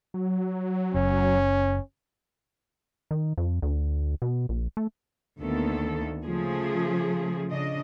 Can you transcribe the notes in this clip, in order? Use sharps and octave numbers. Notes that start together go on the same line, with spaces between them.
F#3
F#1 C#4
D#3
F2
D2
B2
A#1
A3
D2 D#3 A#3 B3 A4
C#3 F3 A3 G#4
C#3 D4 D#5